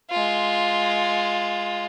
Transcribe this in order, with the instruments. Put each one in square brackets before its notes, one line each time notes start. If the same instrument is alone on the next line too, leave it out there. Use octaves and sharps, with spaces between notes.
[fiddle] G#3 F4